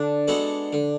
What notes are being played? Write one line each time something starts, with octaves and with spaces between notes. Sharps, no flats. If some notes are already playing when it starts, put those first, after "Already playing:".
Already playing: D3 D4
G#3 B3 F#4 A4
D3